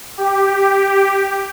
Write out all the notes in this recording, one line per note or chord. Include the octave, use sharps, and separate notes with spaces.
G4